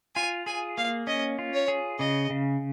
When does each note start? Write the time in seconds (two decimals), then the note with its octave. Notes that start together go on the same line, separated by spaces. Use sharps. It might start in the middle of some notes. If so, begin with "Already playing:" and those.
0.15 F4 G#5
0.46 G#4 G#5
0.77 A#3 F5
1.07 C#4 D#5
1.39 F4
1.54 C#5
1.68 G#4
1.99 C#3 D#5
2.30 C#3